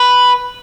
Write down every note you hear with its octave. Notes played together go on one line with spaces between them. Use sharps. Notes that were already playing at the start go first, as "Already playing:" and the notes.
Already playing: B4